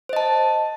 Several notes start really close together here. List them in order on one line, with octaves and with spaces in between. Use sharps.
C5 D#5 A5